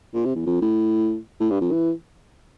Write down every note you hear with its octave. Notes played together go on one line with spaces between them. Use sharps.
A#2
C3
E2
F2
A2
A2
G2
F2
E3